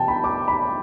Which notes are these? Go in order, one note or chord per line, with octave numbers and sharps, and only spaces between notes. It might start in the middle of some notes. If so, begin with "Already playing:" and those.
Already playing: B2 G5 A5
B5
D6
B5